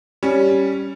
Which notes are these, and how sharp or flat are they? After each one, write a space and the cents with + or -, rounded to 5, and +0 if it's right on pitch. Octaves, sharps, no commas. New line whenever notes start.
G3 -5 C#4 +0